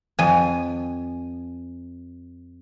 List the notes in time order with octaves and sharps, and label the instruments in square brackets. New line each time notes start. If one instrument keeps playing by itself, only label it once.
[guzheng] F2 G#5